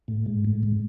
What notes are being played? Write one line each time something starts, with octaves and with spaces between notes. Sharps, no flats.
A2
G#2
A2
G#2